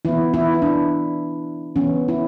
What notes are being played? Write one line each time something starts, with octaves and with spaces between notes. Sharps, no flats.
E3 B3 E4
E3 E4
E4
D4
E3 B3 C#4
E4